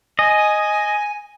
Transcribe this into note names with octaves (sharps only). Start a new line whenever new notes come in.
D#5 G#5